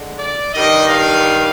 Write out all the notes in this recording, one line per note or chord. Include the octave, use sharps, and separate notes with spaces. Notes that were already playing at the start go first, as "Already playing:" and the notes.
Already playing: D3 G#3
D5
G2 D#3 G3 D#5
F5